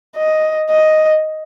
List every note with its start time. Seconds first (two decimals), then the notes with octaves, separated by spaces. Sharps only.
0.17 D#5
0.70 D#5